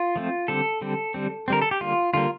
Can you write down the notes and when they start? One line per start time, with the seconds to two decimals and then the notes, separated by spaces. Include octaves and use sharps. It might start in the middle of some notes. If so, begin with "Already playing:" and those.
Already playing: F4
0.16 F3 A3 C4
0.48 D3 G3 C4 A4
0.81 D3 G3 C4
1.14 D3 G3 C4
1.48 D3 G3 C4 A#4
1.62 A4
1.71 G4
1.81 D3 G3 A#3 F4
2.14 D3 G3 A#3 F4